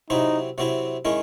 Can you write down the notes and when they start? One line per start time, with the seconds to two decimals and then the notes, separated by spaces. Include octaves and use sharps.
0.10 C3 F#3 C4 D#4 E4
0.58 C3 F#3 C4 E4
1.05 D#3 G#3 C#4 E4